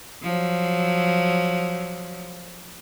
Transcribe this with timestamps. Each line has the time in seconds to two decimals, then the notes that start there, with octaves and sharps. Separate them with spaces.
0.22 F3 F#3